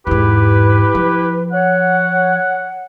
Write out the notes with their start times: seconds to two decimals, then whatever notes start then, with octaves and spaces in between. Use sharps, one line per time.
0.07 E2 G#2 E4 G4 B4
0.95 F3
1.53 C#5 F#5